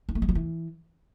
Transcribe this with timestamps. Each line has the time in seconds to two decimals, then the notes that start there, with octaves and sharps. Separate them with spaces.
0.09 C4
0.15 A3
0.22 G3
0.29 F#3
0.35 E3